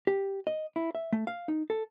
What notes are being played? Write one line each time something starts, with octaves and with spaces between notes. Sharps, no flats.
G4
D#5
E4
E5
A3
F5
D#4
A4